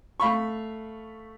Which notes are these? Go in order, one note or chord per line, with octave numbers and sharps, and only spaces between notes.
A3 F5 B5 C#6